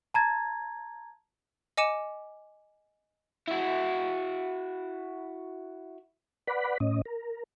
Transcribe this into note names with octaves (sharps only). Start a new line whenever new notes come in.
A5 A#5 G#6 A6
D#5 G#5 D6 C#7 D#7 E7
E4 F#4
B4 D5 F#5 B5
A2 C#4 D#5
A#4